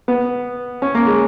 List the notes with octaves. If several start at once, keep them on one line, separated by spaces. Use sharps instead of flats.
B3
C#4
A#3
G#3